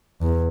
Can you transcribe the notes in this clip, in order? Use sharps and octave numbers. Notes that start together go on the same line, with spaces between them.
E2